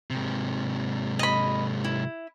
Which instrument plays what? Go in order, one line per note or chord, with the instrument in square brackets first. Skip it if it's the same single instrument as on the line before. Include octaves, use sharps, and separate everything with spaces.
[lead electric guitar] G#2 C3
[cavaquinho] D#5 B5
E4